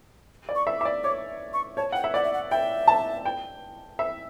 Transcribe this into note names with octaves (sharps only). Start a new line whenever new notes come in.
D5
C#6
E5
E5 D6
D5
C#5 D6
C#6
C#5 A5
F#5 G5
E5
D5 F#5
E5
F#5
E5 G5
A5
G5
E5